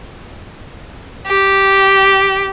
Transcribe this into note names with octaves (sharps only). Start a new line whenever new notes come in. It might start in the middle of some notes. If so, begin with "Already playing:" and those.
G4